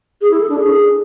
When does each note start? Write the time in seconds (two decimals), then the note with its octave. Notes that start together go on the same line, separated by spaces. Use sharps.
0.21 G#4
0.31 E4
0.40 A4
0.50 D4
0.59 G#4